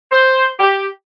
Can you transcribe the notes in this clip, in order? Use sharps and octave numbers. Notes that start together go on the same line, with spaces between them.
C5
G4